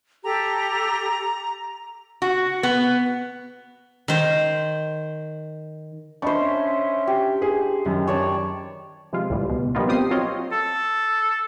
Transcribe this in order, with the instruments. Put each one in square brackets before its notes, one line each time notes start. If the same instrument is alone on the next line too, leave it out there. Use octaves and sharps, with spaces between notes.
[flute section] G4 A4 [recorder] A#5
[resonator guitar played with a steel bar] F#4
B3
[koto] D#3 C5
[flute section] C#4 E5 [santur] D4 C5 [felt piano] D#5 B5 C#6
[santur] G4
[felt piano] G#4
F#2 D#3
[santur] C#5 D5 A5
[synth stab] C3 F3 G#3 F4
C#2 A2 E3 G3
B2
F3 G3 A#3 B3 D#4 F4
C4 F4 G4 D#6 C7
F#3 C4 F4 C#5 D#5
[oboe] A4